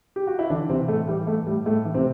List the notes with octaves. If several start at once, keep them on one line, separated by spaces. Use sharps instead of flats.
G4
F#4
E4
D3 E3 D4
C3 E3 C4
A2 A3
E3 G3
A2 A3
A2 G3
A2 A3
E3
C3 C4